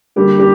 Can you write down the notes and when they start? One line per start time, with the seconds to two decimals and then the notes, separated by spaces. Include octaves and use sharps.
0.16 D3 G3 A#3 G4
0.39 G4